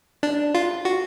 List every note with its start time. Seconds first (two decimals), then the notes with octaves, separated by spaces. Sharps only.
0.23 D4
0.55 F4
0.85 F#4